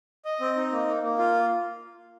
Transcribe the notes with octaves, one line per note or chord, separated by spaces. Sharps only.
D#5
C4
D#4
A#3
A#3
A#3
F4